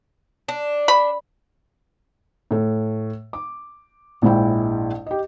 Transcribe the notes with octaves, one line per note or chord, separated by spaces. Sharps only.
D4
B5
A2 A4
D6
A#1 G#2 G#3 E4 G5
G4 D#5